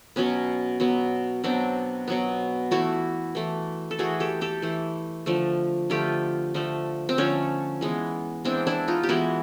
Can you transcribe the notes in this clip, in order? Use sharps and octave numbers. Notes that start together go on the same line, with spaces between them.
B2 F#3 B3 C#4
B2 F#3 B3
B2 F#3 B3 C4 D4
B2 F#3 B3
E3 A3 E4 F#4
E3 A3
A4
E3 A3 F#4 G#4
G4 A4
G4 A4
E3 A3
D3 F3 A3
D3 F3 A3 F4 G4
D3 F3 A3
C4
D3 F3 A3 C#4
E3 G#3 B3
E3 G#3 B3 C4 D4
D4 E4
D#4 F4
G4
E3 G#3 B3 E4 F#4